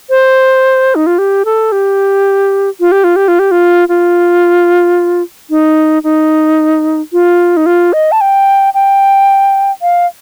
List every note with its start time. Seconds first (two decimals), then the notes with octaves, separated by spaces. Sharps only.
0.10 C5
0.95 D#4
1.06 F4
1.18 G4
1.45 A4
1.72 G4
2.80 F4
2.92 G4
3.04 F4
3.16 G4
3.28 F4
3.39 G4
3.51 F4
3.88 F4
5.50 D#4
6.04 D#4
7.13 F4
7.57 D#4
7.66 F4
7.93 D#5
8.12 A5
8.21 G5
8.74 G5
9.82 F5